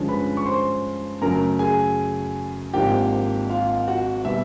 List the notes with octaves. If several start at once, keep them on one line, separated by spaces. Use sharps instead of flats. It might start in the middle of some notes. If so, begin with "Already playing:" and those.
Already playing: G2 D3 F3 G#3 C#4
B4 B5
C#6
C5 C6
F#2 C#3 F#3 A3 A#4 A#5
G#4 G#5
G#1 G#2 F3 A#3 D4 G4 G5
F4 F5
F#4 F#5
B2 G3 E5